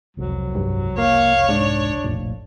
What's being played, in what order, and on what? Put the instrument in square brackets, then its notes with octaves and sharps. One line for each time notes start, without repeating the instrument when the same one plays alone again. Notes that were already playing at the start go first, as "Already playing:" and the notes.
[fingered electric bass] E1 C2 F2 [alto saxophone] F#3
[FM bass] G2
[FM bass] A#3 [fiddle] C#5 [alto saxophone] F5
[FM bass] G#2 [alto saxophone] D4
[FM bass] F1 [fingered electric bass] A#1 F2 A2